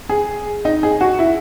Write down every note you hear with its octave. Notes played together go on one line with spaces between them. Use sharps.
G#4
D#4
G#4
F#4
E4